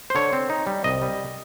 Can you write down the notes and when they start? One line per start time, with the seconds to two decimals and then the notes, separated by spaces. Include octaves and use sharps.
0.10 C5
0.15 D3 C#5
0.33 C4
0.50 D#4
0.67 G3
0.84 C2 D#5
1.02 G3